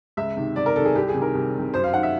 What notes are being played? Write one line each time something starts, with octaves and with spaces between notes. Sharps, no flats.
C#2 E5
C3 D#3
C#2 D5
A#4
C3 D#3 A4
G#4
C2 G4
G#4
C3
D#3 A#4
C2
C3 D#3
F#2 C5
F5
D#3 F#5
E5